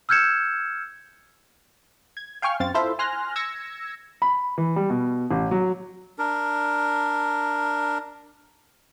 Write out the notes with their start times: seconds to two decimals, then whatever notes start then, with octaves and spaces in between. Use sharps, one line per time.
0.09 E6 F6 G6 G#6 C#7 E7
2.17 G#6
2.42 F5 G5 G#5 C#6 F6
2.60 F#2 C4 F5 A6
2.74 E4 F4 A4 C5 E5 F5
2.99 G#5 C6 F6 F#6 A#6
3.36 E6 G#6 A#6 C#7
4.22 B5
4.58 E3
4.76 G3
4.90 B2
5.31 A1
5.51 F#3
6.19 D4 A#4